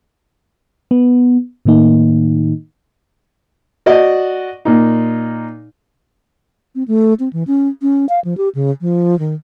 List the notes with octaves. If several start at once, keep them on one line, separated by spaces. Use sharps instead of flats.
B3
A2 D#3 A#3 D#4
F#4 D5 D#5
A#2 D#4
C4
A3
C4
E3
C#4
C#4
F5
F3
G4
C#3
F3
D#3